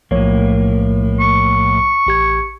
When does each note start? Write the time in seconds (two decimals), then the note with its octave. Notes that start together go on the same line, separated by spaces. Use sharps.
0.11 B1 A2 F3 A#3 C#5
1.20 C#6
2.07 A1 G4 G#6